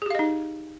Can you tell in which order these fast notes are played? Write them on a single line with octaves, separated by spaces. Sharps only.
G#4 G4 F5 D#5 D#4